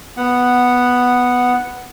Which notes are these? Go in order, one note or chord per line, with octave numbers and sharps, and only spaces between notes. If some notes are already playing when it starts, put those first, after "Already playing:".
B3 F#5